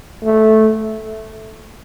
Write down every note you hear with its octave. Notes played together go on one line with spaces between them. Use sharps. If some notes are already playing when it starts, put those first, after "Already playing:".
A3